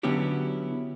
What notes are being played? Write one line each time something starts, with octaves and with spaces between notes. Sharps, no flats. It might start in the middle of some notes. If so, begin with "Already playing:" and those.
D3 F#3 B3 C#4 E4 G4